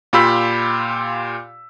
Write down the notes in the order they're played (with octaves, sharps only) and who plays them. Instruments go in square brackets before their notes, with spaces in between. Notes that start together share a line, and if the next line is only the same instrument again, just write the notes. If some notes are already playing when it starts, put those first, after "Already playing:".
[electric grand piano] A#2 F4 G4 B5 E6 B6